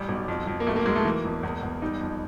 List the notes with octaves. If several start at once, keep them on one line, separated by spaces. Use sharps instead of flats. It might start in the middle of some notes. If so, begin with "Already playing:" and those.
Already playing: A1 G3
B1
F2
F2
A#3
B1 A3
A#3
B1 G#3
A3
E3 A#3
E1
E2
E2
G3 D#4
F2